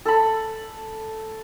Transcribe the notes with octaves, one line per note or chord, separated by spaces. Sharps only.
A4 B5